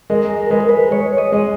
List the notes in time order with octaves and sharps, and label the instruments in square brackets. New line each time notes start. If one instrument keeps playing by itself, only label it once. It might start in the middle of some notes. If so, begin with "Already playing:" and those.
[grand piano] G#3 [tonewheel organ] A#4
[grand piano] G#3 [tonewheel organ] B4
[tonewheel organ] A#4
B4
[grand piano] G#3 [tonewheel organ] C#5
[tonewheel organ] D#5
[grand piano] G#3